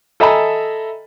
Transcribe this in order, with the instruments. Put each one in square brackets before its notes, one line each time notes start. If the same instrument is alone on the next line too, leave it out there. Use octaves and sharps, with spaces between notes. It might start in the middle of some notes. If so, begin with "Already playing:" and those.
[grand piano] A4 D#5 E5 G#5 A#5 B5